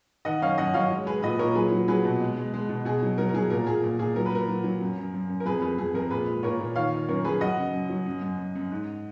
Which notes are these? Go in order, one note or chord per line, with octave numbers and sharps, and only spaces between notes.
D#3 D#5 F#5
F#2 C#5 F5
F#2 D#5 F#5
F#3 C#5 F5
G#3
G#3 G#4 B4
A#2 B4 D#5
A#2 A#4 C#5
F#3 G#4 B4
F#3
F#3 G#4 B4
B2
G#3
G#3
G#3
B2
B2 G#4
F#3
F#3 A#4
A#4
F#3 G#4
A#2 A#4
A#2 G#4
A#2
A#2 G#4
F#3 A#4
B4
F#3 A#4
F#3
F#3
F#2
F#2
F#2
F#2
A#4
F2 G#4 B4
F2 G#4 B4
F2 G#4
F2 A#4
A#2 G#4 B4
G#3
A#2 A#4 C#5
A#2
D#3 C#5 F5
D#3
F#2 A#4 C#5
F#2 G#4 B4
F#3 D#5 F#5
C#3
F#2
F#3
F#2
F#2
F#2
F#2
G#2